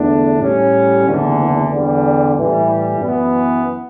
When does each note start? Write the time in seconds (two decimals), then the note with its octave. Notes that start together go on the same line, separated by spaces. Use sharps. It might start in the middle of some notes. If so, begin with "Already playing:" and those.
Already playing: E2 D3 A3 D4
0.40 A2 G3 C#4
1.06 F#1 E2 D3
1.70 E2 D3 G3
2.35 A2 E3 G3
2.99 F#2 E3 B3